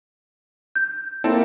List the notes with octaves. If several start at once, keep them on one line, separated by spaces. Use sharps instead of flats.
G6
A#3 C4 E4 A4